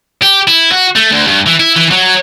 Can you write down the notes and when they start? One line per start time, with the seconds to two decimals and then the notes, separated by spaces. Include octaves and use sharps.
0.22 G4
0.47 E4
0.72 F#4
0.96 A3
1.12 D2
1.28 G2
1.47 E3
1.60 E4
1.77 E3
1.92 F#3